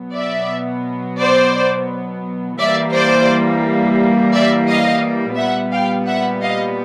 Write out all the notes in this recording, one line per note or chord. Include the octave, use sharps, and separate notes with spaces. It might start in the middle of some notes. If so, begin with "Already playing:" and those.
Already playing: B2 F#3 B3
D5 E5
C5 D5
E3 G3 A#3 D5 E5
C5 D5
D5 E5
D#5 F5
A#2 G3 B3 E5 F#5
F5 G5
E5 F#5
D#5 F5